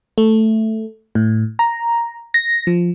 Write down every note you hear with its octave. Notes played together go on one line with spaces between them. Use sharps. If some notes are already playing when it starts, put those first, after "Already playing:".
A3
A2
A#5
A#6
F3